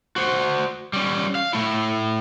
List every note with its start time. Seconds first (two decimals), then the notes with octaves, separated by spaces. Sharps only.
0.16 F#4 C5
0.93 G3 C#4
1.35 F5
1.53 A3 E4